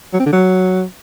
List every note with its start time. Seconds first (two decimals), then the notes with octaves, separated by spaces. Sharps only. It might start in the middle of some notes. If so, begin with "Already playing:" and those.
0.13 F#3
0.20 C4
0.26 D3
0.33 F#3